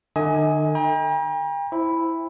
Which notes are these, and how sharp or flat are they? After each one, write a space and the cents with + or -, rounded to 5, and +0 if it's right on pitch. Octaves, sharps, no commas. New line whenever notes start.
D3 +45 D#5 +35 G#5 +0
G5 +40 A#5 +40
E4 +0 C5 +0